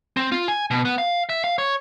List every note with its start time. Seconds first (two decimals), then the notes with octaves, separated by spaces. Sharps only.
0.17 C4
0.32 F4
0.48 G#5
0.71 B2
0.85 B3
0.98 F5
1.29 E5
1.44 F5
1.58 C#5